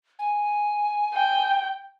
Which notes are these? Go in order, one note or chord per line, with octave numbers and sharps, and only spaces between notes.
G#5
G5